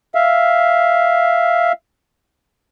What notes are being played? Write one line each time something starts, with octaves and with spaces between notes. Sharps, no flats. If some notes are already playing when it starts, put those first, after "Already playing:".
E5 F5